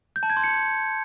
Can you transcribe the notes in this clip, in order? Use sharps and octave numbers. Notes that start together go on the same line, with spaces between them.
G6
A5
G#6
C6
C#7